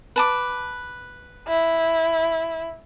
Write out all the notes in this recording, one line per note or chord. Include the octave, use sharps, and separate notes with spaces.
B4 A5 D6
E4